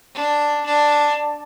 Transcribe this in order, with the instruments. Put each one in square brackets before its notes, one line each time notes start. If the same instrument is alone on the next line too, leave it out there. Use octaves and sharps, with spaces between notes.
[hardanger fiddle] D4
D4